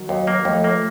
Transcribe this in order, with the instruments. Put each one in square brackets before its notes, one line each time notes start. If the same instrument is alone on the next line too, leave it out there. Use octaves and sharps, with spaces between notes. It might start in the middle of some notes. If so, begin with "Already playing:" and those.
Already playing: [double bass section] D#3 F#3
[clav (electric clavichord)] D#2
A#3
[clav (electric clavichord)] D#2 [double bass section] F3 A3
[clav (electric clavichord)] A#3